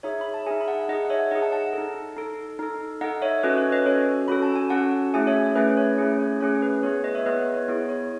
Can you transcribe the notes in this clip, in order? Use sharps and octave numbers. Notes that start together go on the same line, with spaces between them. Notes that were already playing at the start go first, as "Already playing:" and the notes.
D#4 G#4 C#5 E5
B5
A5
D#4 G#4 E5 G#5
B5
F#5 A5
D#4 G#4 D#5 F#5
F#5
C#5 E5
D#4 G#4 D#5 F#5
F#5 A5
F#5 A5
D#4 A4
D#4 A4
D#4 A4
D#4 A4 D#5 F#5
C#5 E5
C#4 F#4 A4 B4 D#5
C#5
B4 D#5
C#4 F#4 A4 C#5
C#4 F#4 A4 B5
A5
G#5
C#4 F#4 A4 F#5 A5
A3 C#4 E4 G#4 E5 G#5
C#5 E5
A3 C#4 E4 G#4 B4
C#5
A3 C#4 E4 G#4
C#5
A3 C#4 E4 G#4 C#5
B4
B3 E4 G#4 C#5
B4 D#5
C#5 E5
B3 E4 G#4 B4 D#5
B4
C#5
B3 E4 G#4 C#5
C#5